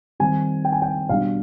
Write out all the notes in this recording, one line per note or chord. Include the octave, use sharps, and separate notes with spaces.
D#3 G3 C4 D#4 G#5
G5
G#5
G5
B2 G3 D4 F5